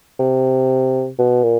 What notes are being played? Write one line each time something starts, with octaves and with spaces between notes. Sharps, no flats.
C3
B2
A#2